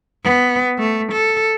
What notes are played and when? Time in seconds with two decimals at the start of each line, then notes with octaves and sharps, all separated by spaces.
0.24 B3
0.79 A3
1.12 A4